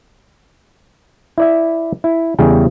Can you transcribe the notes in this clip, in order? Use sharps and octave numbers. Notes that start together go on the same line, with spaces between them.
E4 D5 E5
E4
E2 C#3 G3 G#4 G5